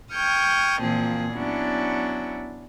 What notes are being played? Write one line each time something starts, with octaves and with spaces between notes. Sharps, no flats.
G5 C#6 D#6 F6 G6 G#6
A#2 E3 F3 A#3 C4 G#4
F#3 B3 C#4 D4 E4